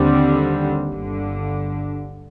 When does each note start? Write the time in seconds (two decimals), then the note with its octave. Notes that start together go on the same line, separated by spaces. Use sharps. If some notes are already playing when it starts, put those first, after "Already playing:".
Already playing: D#2 D3 G3 C4
0.90 G1 G2 D3